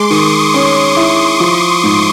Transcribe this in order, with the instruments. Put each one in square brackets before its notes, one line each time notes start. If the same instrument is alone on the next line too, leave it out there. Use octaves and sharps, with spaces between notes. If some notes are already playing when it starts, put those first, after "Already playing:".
Already playing: [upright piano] G#3 [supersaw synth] C6 D6
[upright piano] D#3 [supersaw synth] C#6 D#6
[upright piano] C#4 [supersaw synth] C6 D6
[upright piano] E4
F3
G#2